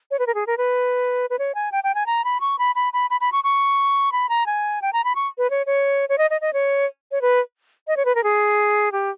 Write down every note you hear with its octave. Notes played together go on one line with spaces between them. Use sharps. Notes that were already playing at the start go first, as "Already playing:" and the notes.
C#5
B4
A#4
G#4
A#4
B4
B4
C#5
G#5
G5
G5
G#5
A#5
B5
C#6
B5
B5
B5
B5
B5
C#6
C#6
B5
A#5
G#5
G5
A#5
B5
C#6
B4
C#5
C#5
C#5
D#5
D#5
D#5
C#5
C#5
B4
D#5
C#5
B4
A#4
G#4
G4